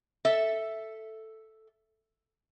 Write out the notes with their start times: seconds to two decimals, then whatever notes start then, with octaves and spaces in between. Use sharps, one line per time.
0.25 A4 E5